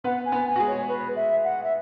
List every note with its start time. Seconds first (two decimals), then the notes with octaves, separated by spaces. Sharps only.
0.04 B3 B4 F#5
0.25 G#5
0.32 B3 B4
0.47 G#5
0.56 F#4
0.60 G#3 G#4
0.68 C#5
0.89 B4
1.16 E5
1.44 F#5
1.64 E5